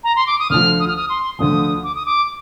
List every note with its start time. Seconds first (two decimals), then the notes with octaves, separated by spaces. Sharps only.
0.04 A#5
0.16 C6
0.27 D6
0.39 D#6
0.50 D2 D3 F3 F6
0.80 D#6
0.87 F6
0.96 D#6
1.09 C6
1.39 D2 D3 F3 D#6
1.84 D6
1.95 D#6
2.05 D6